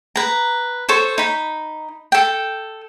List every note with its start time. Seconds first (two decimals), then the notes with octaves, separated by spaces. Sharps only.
0.16 B4 A#5
0.89 A4 C5 C#5
1.18 D#4 B5
2.12 A4 G5